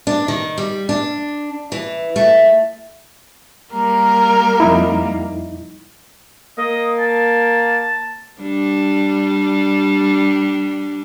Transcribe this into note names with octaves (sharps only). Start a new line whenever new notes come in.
D4
D#3
G3
D4
E3
A3
G3 A#3 A#4
F2 D#4 E4
A#3 D#5
A5
G3 D4